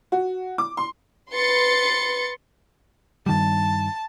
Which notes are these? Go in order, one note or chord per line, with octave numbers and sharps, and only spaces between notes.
F#4
D6
C6
B4 C6 A6 C#7
G2 D#3 G3 A5